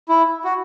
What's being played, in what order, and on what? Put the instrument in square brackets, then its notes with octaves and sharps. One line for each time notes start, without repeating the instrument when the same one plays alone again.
[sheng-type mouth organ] E4
F#4